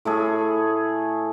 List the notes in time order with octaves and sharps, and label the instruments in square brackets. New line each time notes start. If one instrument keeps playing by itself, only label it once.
[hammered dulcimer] A2 A3 G#4